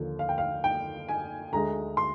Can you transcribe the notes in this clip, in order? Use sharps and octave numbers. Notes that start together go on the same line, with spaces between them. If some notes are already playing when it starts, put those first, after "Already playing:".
Already playing: D#2 D3 F3
F5
G5
F5
G5
G#5
D2 D3 G#3 A#5
C6